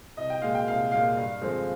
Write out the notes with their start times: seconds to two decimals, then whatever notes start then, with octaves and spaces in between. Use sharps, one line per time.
0.17 C2 D#5
0.30 G5
0.42 A#2 G#3 F5
0.55 G5
0.68 C2 F5
0.92 A#2 G#3 F5
1.17 G2
1.41 D3 F3 G#3 C4